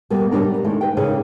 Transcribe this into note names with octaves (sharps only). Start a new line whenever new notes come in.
B2 G3 A#3 B3
A2 C#3 G3 D4 A#4
G3
D#3 G#3 A3 E4
B4 G5
A#2 C#3 C#4 D#4 G#4